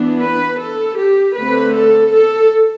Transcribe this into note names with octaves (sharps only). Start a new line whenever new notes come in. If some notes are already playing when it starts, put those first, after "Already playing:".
Already playing: E3 B3 D4
B4
A4
G4
D3 A3 C4 B4
A4
A4